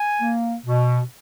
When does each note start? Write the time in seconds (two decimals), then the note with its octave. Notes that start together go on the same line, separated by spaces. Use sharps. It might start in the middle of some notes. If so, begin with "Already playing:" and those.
Already playing: G#5
0.22 A#3
0.66 B2